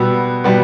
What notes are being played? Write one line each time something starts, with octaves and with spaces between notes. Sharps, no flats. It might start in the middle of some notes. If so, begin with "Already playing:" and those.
Already playing: B2 G3 B3 E6
B2 G3 B3